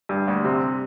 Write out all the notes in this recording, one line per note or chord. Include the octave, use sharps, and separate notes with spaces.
G2
D2
C3